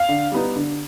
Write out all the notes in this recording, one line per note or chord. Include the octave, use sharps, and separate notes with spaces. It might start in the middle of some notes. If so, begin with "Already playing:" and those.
Already playing: F5
D3
G3 B3 D#4
D3